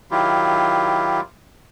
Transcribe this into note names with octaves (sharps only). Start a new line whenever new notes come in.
D#3 F#3 E4 F4 G4